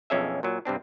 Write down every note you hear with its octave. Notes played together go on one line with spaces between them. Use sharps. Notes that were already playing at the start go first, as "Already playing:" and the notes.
B1 F2 C#4 G#4 E5
A#2 F#3
G2 C3 C4 D4